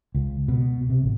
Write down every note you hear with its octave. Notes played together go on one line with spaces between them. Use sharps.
C#2
B2
C3
A1